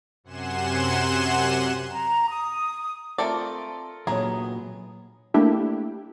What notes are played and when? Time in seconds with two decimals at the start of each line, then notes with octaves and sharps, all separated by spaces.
0.24 F#2 C3 F#5 G#5 C6 E7
1.92 A#5
2.29 D#6
3.18 A3 C4 F4 A4 A#4 D5
4.07 A#2 F#3 B3 G#4 C#5 A#5
5.34 A3 A#3 D4 E4 G4